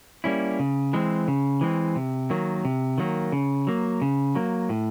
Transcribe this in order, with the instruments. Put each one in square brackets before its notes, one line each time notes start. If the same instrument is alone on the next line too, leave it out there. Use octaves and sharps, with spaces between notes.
[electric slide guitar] G3 A#3 C#4 E4
C#3
E3 G#3 C4
C#3
E3 G#3 C4
C3
D#3 F#3 A#3
C3
D#3 F#3 A#3
C#3
F#3 A#3
C#3
F#3 A#3
A2